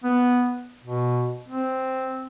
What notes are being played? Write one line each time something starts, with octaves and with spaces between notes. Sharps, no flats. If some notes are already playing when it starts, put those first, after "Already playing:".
B3
B2
C4